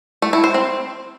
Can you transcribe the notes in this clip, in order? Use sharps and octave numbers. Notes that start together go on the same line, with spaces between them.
A3
E4
C5
C4